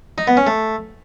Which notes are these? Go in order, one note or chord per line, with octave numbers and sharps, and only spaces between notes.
D#4
B3
C#4
A3